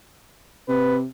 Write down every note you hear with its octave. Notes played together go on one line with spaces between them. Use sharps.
C3 B4